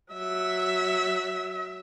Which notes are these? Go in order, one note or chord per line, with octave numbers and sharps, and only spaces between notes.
F#3 E5